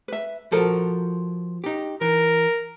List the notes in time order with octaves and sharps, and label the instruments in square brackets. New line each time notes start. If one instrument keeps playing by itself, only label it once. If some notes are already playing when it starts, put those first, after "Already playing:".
[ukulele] B4 E5
[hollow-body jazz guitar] F3 A#4 [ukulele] F#4 A4
[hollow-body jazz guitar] D#4 G4
[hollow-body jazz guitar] E3 [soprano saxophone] A#4